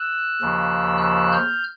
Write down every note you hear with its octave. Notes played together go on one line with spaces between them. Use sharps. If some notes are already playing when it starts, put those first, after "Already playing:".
Already playing: E6 F#6
D#2 C#3 F3
E6 F#6
F6 G6